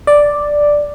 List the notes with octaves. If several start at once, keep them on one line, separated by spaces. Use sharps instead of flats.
D5